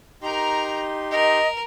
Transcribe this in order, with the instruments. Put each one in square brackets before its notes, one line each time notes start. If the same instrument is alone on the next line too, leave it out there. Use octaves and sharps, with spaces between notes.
[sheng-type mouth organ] D#4 G4 C6 [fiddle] A#4 A#5
[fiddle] A#4 [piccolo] D#5